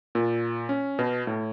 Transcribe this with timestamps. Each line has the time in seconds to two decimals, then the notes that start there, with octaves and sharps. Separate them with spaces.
0.15 A#2
0.69 C#4
0.99 B2
1.27 A2